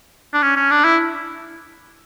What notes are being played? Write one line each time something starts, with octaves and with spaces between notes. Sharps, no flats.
D4
C#4
C#4
D4
E4